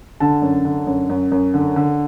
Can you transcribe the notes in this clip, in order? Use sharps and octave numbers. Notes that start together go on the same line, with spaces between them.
D3 A5
F#2
D3
F#2
F#2
F#2
D3
D3